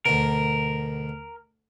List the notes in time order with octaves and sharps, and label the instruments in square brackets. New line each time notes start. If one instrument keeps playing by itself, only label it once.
[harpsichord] D2 B2 [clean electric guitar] A#4